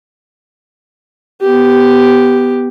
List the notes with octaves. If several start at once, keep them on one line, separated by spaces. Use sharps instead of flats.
B3 G4